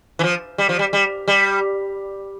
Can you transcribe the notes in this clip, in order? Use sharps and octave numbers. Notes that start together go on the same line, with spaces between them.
E3
F3
G3
F3
G3
G3
G3